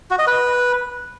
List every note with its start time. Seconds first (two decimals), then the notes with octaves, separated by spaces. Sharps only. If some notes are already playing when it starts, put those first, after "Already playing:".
0.11 F#4
0.19 D#5
0.27 B4